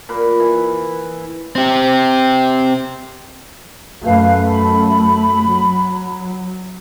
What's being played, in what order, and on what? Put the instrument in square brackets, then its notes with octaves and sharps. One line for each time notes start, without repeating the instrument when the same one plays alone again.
[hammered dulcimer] A#2 B4
E3
[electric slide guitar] C4 G4
[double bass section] F#2 A3 [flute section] B4 F5
[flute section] B5
[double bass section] F#3